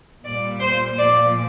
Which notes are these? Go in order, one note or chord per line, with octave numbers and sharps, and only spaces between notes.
A#2 G3 D5
C5
A#2 F3 D5